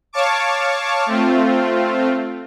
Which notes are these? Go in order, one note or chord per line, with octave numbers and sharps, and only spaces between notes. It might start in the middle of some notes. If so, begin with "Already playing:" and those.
C#5 F5 A5 C#6 D6
A3 C4 F4